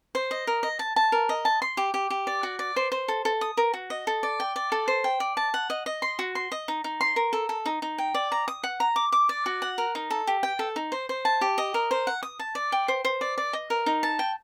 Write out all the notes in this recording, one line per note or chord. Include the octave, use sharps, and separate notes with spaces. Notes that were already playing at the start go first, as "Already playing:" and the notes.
C5
D#5
A#4
D#5
A5
A5
A#4
D#5
A5
C6
G4
G4
G4
D5
F#4
D5
C5
C5
A4
A4
D#6
A#4
F#4
D#5
A4
D5
G5
D5
A4
C5
G5
D5
A5
F#5
D#5
D#5
C6
F#4
C6
D#5
D#4
D#4
C6
A#4
A4
A4
D#4
D#4
G5
D5
A#5
D#6
F#5
A#5
D6
D6
D5
F#4
F#5
A#4
D#4
A4
G4
G5
A4
D#4
C5
C5
A5
G4
D#5
A#4
C5
F#5
D#6
A5
D5
G5
C5
C5
D5
D5
D#5
A#4
D#4
A5
G5